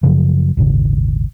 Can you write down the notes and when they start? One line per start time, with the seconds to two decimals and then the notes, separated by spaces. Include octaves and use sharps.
0.03 F#2 C#3 F3 F#3
0.57 D#1 G#1 C#3